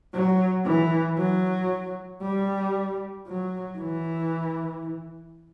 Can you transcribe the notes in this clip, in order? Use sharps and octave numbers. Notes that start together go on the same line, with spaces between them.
F#3
E3
F#3
G3
F#3
E3